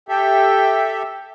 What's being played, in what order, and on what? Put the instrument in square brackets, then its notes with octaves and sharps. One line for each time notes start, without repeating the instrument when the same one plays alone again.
[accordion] G4 A4 E5 [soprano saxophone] G5